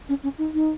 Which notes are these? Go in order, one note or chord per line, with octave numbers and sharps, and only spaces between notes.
C#4
C#4
D#4
D#4